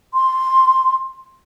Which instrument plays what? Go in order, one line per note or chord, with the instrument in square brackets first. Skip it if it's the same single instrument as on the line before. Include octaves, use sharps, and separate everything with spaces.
[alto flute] C6